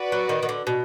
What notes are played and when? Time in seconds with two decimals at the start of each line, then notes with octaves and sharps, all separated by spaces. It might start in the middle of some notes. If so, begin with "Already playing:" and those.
Already playing: F#4 B4 D5
0.12 F#3
0.29 D#3
0.43 D#3
0.49 D3
0.67 B2